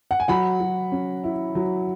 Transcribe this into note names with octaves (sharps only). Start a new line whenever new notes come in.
F#5
G#5
F#3 F#5 B5
F#3
C#4
E4
F#3